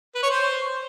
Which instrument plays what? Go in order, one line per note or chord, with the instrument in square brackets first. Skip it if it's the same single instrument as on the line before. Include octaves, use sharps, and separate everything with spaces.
[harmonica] B4
C#5
C5